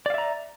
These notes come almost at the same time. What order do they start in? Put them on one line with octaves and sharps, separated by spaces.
D5 F5 E5 A#5